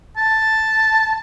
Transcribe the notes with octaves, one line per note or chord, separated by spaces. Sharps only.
A5